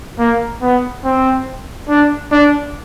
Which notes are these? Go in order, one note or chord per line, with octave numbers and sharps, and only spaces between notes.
A#3
B3
C4
D4
D4